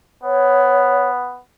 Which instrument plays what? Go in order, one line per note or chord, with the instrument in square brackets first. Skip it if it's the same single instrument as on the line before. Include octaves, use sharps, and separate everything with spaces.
[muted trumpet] B3 [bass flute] C#5